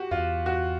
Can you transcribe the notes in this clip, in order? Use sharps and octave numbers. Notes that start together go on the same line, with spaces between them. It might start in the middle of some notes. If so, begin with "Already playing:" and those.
Already playing: F#4 G4
E2 F4
F#4